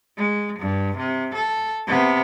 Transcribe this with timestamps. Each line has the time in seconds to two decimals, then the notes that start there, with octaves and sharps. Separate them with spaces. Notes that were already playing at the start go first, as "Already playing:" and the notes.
0.17 G#3
0.60 G2
0.97 C3
1.35 A4
1.87 C3 B3